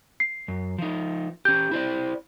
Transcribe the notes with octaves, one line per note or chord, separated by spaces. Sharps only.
C7
F#2
F3 D#4
C#4 G4 G6
E4 C5 D5